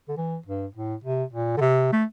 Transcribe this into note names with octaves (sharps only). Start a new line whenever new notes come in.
D3
E3
G2
A2
C3
A#2
D3
C3
A3